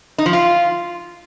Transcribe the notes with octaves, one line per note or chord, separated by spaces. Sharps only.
D#4
F3
F4